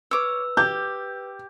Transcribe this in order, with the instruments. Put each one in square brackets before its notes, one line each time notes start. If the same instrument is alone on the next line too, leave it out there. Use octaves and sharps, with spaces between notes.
[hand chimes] B4 E6 [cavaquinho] C#5 D6
[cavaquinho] G4 [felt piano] G6